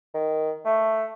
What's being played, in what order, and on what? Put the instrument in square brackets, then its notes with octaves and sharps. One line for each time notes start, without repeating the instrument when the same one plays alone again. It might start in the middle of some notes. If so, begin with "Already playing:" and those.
[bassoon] D#3
A3